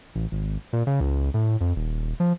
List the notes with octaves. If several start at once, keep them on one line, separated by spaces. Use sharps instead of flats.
A1
G#1
A#2
C#3
C#2
A2
F2
D#1
F3